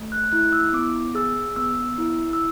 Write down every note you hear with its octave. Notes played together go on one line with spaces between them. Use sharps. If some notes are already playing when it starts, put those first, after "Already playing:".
Already playing: A3
F#6
E4 F#6
E6
B3 D6
G#4 E6
B3 E6
E4
E6